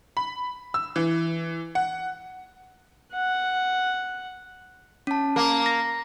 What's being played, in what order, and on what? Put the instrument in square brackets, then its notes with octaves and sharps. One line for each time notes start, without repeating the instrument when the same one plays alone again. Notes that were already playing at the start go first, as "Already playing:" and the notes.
[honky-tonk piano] B5
E6
E3
F#5
[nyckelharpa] F#5
[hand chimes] C#4 A5
[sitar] A#3
[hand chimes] A#6